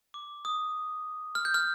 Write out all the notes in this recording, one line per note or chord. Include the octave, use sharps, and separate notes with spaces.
D6
D#6
F6
G6
F6